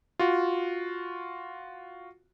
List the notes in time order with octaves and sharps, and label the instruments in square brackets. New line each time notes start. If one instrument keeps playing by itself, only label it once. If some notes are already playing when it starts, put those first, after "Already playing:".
[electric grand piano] F4 F#4